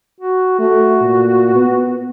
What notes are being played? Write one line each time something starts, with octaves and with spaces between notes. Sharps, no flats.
F#4
A3 F#4
A#2
B3